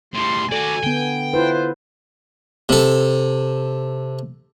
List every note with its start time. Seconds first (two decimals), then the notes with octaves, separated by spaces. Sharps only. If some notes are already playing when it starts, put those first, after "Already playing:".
0.14 A2 G3 C6
0.52 F#4 A4 D5 G#5
0.84 D3 B3 G5
1.34 E4 F4 B4 C5
2.69 C3 A4